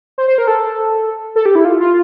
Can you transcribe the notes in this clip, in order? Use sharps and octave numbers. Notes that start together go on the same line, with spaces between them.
C5
C5
A#4
A4
A4
G4
E4
F4
F4